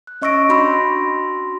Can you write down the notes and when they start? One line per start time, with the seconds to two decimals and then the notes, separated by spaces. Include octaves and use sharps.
0.07 F#6
0.22 C#4 D#5 C#6 E6 A#6 D7
0.49 D4 F#4 B5 C6 E6 A#6